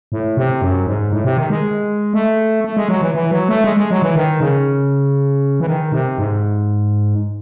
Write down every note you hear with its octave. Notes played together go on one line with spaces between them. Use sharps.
A2
C3
F#2
G#2
A2
C3
D#3
G#3
A3
A3
G#3
F#3
E3
E3
F#3
A3
G#3
G#3
F#3
E3
D#3
C#3
E3
D#3
C3
G#2